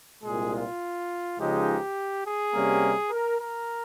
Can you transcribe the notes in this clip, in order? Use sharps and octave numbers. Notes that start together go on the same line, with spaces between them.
C2 A#2 G#3 G#4
F4
C#2 C#3 F3 G#3 D#4 G4
G#4
C3 G3 A#3 C#4
A#4
A#4